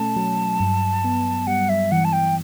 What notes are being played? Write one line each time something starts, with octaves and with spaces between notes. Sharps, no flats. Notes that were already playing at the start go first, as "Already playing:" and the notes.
Already playing: B2 A3 C#4 A5
F#3
G2
B3
G3 F#5
E5
E3 F#5
A5
G5